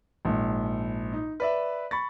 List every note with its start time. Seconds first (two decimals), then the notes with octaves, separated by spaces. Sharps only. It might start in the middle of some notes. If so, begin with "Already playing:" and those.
0.25 A#1 G#2
1.13 D#4
1.40 B4 D5 E5
1.91 B5 C#6 A6